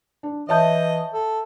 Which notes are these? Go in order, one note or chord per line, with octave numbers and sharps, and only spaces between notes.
D4
E3 C#5 D#5 E5 A5 G6
A4